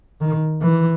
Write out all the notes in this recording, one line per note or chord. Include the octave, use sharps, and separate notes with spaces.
D#3
E3